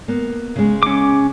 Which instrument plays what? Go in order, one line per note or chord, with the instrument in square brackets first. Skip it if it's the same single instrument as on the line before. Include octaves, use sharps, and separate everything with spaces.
[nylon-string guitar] A#3 B3
C#3 G#3
[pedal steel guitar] C#4 D6